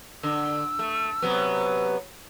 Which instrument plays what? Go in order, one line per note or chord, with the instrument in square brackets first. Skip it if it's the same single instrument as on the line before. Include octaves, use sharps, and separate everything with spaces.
[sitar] D3 [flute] E6
[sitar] A3
C3 F#3 B3